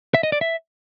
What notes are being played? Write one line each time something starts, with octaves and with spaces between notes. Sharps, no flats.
E5
D#5
D5
E5